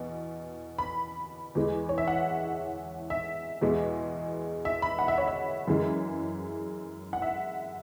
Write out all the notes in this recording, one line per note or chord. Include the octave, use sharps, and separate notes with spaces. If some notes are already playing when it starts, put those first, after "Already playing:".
Already playing: E2 B2
B5
E2 E3 G#3
C#5
E5
F#5
E5
E2 B2 G#3
E5
B5
F#5
E5
C#5
E5
F#2 E3 G#3
F#5
E5